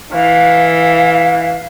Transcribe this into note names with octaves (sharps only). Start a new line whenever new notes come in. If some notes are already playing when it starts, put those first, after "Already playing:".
E3 F5